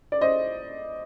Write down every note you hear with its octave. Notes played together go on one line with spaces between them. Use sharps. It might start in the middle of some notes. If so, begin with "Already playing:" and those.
D5
C5 D#5